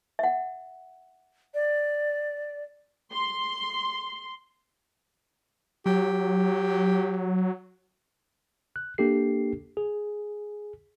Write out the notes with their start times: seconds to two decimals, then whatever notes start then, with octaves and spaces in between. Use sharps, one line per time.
0.19 E5 F#5
1.54 D5
3.13 C6
5.86 F#3 G4
8.76 F#6
8.98 A#3 D4 G4 A4 C7
9.77 G#4